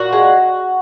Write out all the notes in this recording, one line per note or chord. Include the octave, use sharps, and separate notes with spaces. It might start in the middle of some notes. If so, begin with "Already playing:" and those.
Already playing: A#2 F#4
G#3